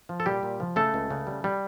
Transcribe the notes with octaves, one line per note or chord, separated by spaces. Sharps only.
F3
A4
A#2 G3 G4
A#2
F3
C#3 A3 A4
C#2
C#3
G3
G3